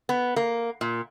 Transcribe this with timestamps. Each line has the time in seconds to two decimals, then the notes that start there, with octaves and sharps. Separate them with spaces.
0.09 B3
0.36 A#3
0.81 A#2